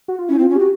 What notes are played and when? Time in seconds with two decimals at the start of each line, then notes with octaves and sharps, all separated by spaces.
0.08 F#4
0.19 F4
0.29 C#4 E4
0.39 C4
0.42 F4
0.49 C#4
0.56 F#4 G4